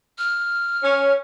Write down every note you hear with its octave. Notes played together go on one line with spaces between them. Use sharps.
F6
C#4